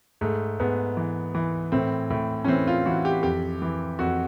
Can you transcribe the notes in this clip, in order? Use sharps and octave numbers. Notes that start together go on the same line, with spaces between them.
G#2 A3
G#2 B3
E3
E3
A2 C4
A2
C#4
E3 C4
F4
E3 F#4
G4
F2 G4
E3
F2 F#4